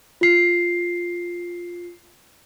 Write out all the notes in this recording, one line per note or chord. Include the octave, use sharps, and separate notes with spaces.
F4 C7